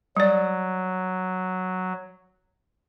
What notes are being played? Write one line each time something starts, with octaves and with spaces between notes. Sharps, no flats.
F#3 G3 D5